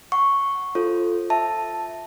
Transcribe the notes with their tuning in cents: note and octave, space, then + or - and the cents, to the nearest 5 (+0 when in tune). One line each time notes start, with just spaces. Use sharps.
F#5 +0 C#6 +0
F4 +0 A4 +0 C5 +25
E5 +0 A5 +0